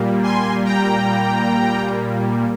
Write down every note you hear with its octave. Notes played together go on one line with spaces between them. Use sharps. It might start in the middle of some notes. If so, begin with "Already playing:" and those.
Already playing: A#2 G3 A#3
G#5 C6
G5 A#5